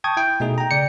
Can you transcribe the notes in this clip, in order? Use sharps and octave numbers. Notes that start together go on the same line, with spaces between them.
G5 A5 C#6 D#6 G#6
E4 G5
B2 A3 D#4 G#4
G5 A#5
C#3 D5 G5 C#7